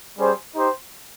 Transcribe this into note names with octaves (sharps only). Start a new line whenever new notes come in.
G3 C#4 G#4 C5
D#4 G4 C5